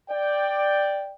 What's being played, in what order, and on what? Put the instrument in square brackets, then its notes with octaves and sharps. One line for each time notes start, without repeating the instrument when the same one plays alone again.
[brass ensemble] D5 G5